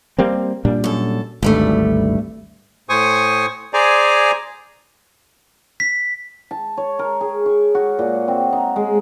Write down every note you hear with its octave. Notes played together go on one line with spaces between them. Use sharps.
G3 A#3 C4
A#2 G3 D4
F#2 A4
G#1 D2 G2 G3 A3
A2 C5 G#5 C#6 D#6
G#4 C5 D5 G#5 A#5
B6
A5
C#5
A#4
G#4
C#6
F#4
A#2
C4
D#4
G#3